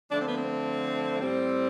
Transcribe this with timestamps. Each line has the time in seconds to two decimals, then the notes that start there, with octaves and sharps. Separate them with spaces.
0.10 D3 F3 A3 D4
0.19 C4
0.27 B3
0.36 C4
1.20 A2 G3 C4